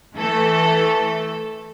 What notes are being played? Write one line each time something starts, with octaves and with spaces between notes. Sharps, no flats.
E3 A3 A4